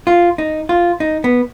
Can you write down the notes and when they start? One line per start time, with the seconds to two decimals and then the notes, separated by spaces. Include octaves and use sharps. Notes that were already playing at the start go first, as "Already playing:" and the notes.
0.07 F4
0.38 D#4
0.69 F4
1.00 D#4
1.24 B3